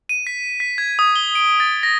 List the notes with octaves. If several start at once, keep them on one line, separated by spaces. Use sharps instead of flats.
D#7
B6
B6
G#6
D#6
G7
D7
A6
A#6